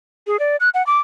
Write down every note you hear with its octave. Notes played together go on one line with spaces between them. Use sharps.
G#4
D5
F#6
F#5
D6